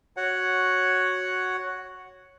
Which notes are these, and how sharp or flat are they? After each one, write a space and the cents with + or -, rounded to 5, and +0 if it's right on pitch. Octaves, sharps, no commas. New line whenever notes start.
F#4 +0 C#5 +0 F#5 +0